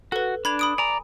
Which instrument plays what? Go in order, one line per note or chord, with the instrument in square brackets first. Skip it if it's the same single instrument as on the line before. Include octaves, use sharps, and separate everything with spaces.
[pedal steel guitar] F#4 [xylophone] A4 B4
[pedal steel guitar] D4 [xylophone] B5 G#6 F7
[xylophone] B5 D#6 D7
[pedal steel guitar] D5 A#5 [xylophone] G#5